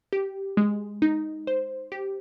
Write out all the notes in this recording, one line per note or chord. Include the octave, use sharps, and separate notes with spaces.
G4
G#3
D#4
C5
G4